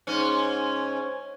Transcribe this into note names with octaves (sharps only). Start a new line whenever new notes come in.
G#2 C#4